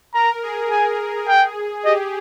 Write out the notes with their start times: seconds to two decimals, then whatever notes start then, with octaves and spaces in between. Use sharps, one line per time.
0.14 A#4 A#5
0.43 G#4
0.71 G#4 G#5
1.28 G5
1.84 G4 D#5